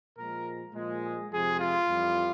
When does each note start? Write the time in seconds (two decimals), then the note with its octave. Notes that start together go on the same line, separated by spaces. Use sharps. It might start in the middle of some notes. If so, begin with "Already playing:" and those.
0.17 A#2 F3 G#3 A#4
0.74 A#2 F3 G#3
1.03 G#4
1.31 F2 C3 F3 G#3 G#4
1.59 F4
1.87 F2 E3 G3